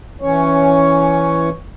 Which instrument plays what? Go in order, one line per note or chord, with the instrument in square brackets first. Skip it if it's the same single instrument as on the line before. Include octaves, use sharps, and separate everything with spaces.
[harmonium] E3 C#4 C#5